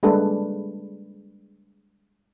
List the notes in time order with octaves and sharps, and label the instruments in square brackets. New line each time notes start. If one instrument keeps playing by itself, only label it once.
[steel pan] G3 G#3 A#3 D4 A4 B4